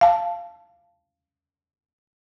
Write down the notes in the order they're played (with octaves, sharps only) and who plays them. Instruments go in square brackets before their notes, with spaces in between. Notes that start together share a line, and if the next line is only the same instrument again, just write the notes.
[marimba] F5 A5